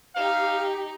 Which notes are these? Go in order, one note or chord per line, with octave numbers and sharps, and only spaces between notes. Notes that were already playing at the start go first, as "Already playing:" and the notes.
D#4 G4 F5